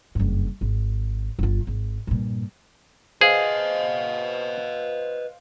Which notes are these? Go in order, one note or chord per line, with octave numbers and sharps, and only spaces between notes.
F#1 G2
G#1
G1 F4
G#1
G2 A#2
G#4 B4 C5 D#5 F5